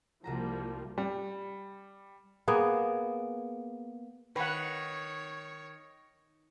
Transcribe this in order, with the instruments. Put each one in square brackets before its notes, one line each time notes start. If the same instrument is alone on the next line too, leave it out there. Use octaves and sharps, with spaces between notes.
[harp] C2 F#4 A#5 [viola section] F3 G3 A#3
[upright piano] G3
[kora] A#3 B3 G#4
[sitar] D#3 [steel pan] B4 F#5 [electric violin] C#5